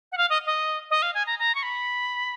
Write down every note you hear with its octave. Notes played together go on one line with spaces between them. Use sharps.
F#5
F5
D#5
D#5
D#5
F5
G#5
A#5
A#5
C#6
B5